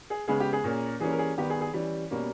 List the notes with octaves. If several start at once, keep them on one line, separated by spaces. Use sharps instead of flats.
G#4
C#3 G#3 B3 G#4
G4
G#4
A#2 A#3 C#4
E3 G3 A#3 C#4 G#4
A#4
G#4
D#3 G3 B3 G4
G#4
G#4
E3 G3 C#4
B2 G3 A#3 C#4